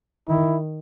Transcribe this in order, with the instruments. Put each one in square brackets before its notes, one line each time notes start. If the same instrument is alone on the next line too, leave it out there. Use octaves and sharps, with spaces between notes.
[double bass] D#3 [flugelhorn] E4